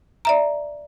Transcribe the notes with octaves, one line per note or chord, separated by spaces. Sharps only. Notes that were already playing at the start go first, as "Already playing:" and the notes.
D5 E5 A#5